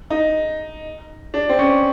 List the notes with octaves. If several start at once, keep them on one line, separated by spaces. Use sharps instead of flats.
D#4
D4
C4
C#4